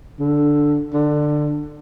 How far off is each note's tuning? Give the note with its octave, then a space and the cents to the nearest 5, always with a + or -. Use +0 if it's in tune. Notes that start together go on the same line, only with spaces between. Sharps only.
D3 +0
D3 +20